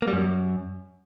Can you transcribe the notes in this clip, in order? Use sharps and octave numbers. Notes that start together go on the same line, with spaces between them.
A#3
G3
F#2